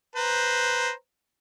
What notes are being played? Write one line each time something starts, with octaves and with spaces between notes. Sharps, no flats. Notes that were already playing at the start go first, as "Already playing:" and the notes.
B4 C5 A#5